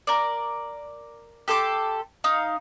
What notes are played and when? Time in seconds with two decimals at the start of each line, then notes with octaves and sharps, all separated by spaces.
0.07 A#4 D5
1.48 G4 A4 C6 D6
2.24 D#4 F5